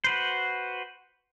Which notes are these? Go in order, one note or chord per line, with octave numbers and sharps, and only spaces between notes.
F#4 B4 C5